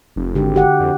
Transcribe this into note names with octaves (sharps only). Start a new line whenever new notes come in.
F1
G#1 D3 G4
F#4 G4 F#5
F2